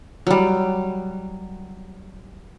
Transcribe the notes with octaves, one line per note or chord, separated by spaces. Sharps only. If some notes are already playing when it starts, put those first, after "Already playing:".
F#3 G3